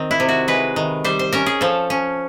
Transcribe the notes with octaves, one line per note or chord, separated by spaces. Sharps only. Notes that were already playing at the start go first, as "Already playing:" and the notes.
Already playing: D#3 C4
E4
C3
F#4
G#3 B4
D#3
G3 C5
C5
C#4 A#4
G#4
F3 A4
C#4